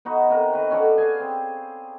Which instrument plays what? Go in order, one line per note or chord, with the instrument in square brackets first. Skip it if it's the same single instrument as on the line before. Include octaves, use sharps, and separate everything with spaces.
[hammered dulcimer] B3 D#4 F#4
C3 A#4
D#3 B4
C#4 F#4 A4 D5
G#4 F5 G#5
C4